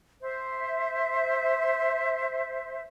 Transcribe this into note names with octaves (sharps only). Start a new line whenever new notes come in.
C5 E5